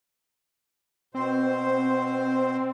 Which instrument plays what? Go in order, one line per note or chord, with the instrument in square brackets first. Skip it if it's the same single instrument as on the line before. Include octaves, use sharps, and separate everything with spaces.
[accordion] B2 C5 [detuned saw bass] C4